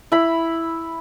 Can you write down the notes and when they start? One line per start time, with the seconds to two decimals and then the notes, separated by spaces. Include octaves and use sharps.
0.12 E4 B5